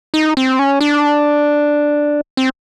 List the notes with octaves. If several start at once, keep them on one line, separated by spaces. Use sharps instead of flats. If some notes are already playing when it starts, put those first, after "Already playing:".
D#4
C4
C#4
D4
C4